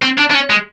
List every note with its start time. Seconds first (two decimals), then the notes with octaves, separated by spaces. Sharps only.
0.02 C4
0.18 D4
0.30 D4
0.33 C#4
0.50 G#3